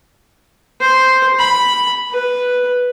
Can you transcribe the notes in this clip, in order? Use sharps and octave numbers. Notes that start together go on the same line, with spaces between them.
C5
B5
B4